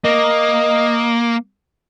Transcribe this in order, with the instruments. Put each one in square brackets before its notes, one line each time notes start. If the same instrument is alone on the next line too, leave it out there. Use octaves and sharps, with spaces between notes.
[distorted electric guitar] A#3 [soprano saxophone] D#5